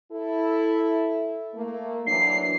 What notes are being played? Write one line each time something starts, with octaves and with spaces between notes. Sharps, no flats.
E4 A4
A3 A#3
E3 F#3 D4 C7